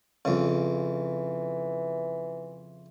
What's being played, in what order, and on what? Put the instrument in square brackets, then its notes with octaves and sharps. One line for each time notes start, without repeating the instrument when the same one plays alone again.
[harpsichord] F2 C#3 [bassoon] E3